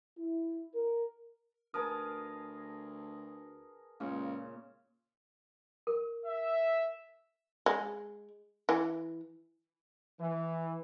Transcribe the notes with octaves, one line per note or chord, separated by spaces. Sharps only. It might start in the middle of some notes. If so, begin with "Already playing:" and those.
E4
A#4
D2 G#4 A#4 B4 A5 D#6
C#2 A#2 C#3
A#4
E5
G#3
E3
E3